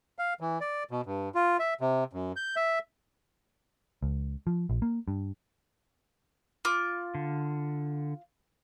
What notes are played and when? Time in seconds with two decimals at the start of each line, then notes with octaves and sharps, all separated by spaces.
0.19 F5
0.41 E3
0.61 D5
0.91 B2
1.06 G2
1.35 F4
1.59 E5
1.81 C3
2.13 F#2
2.36 G6
2.56 E5
4.03 C#2
4.47 F3
4.69 A#1
4.82 A#3
5.08 G2
6.65 F4 D6
7.15 D3